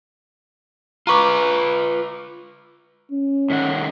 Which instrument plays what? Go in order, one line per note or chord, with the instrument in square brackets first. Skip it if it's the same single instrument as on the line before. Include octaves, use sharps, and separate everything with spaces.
[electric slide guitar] F4 B4 [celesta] A#5 C#6 D6
[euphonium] C#4
[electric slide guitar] A2 D#3 F#5